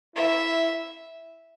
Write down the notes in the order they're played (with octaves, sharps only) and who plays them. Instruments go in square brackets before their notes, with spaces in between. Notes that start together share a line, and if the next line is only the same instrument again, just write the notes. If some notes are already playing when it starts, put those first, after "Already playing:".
[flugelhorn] E4 [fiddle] E5